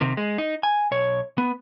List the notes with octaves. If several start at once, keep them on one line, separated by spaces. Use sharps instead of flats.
C3 D#3
G#3
D#4
G#5
B1 C#5
B3